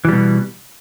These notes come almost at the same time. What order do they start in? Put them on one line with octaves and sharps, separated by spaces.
E3 G3 B2